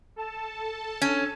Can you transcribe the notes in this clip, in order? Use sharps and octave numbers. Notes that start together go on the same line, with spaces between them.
A4 A5
C#4